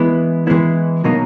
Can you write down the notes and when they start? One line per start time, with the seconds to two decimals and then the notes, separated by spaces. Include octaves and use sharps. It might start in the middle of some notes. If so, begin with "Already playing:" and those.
Already playing: E3 G#3 B3 E4
0.47 E3 G#3 B3 E4
1.04 B2 F#3 A#3 D#4